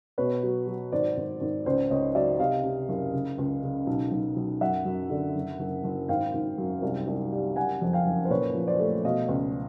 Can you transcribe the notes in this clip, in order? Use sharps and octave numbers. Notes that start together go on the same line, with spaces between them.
B2 B4 C#5
F#3
F#3
G#1 C5 D5
G#1
G#1
C#2 C5 D5
C#2 C#5 D#5
F#3 D5 E5
C3 D#5 F5
C3
F#1
C#3
C#2
C#3
B1
B1
B1
F#2 E5 F#5
F#2
D3
F#1
F#1
F#1
G#1 F5 G5
G#1
F#2
C2
C2
G3
F#1 F#5 G#5
F2
F5 G5
F#1
C5
A#2 B4 C#5
F3
C5 D5
A3
B2 D#5 F5
C#2